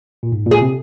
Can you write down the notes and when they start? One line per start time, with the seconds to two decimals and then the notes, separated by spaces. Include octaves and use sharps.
0.23 A#2
0.32 G#2
0.46 A#2 G#4
0.62 C3